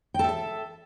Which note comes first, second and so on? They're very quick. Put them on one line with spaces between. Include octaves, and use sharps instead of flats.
G5 A4 E5 A5